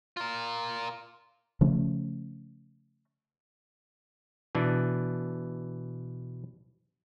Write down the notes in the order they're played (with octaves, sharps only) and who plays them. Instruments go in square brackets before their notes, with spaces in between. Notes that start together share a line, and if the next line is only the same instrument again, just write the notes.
[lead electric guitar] F4 A#4
[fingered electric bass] C#3 F3 A3 C#4
[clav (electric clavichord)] B2 E3 D4